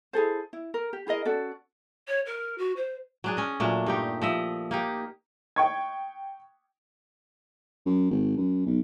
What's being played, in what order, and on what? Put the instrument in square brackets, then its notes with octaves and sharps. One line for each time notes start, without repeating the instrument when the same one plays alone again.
[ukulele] E4 G#4 A4 C5
E4
A#4
G4
E4 G#4 A#4 D#5
C#4 F#4 A4 D5
[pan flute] C#5
A#4
F#4
C5
[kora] F#3 D4 G#4
C#4 D#5
A#2 F#3 A3 D4
G2 D#4 G4
F3 D#5 E5
A#3 D#4 G4
[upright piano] G5 C#6 G#6
[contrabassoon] F#2
G#1
F#2
B1